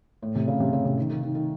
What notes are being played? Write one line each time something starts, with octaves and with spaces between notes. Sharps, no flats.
A2
C3
C#3
C3
C#3
C3
D#3
D#3
D#3
D#3